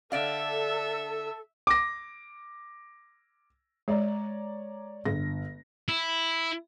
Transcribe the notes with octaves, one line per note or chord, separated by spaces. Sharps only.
D3 A4 D5 E5 F5
D6 A#6
G#3 C#5 D5 A#5
G1 A#6
E4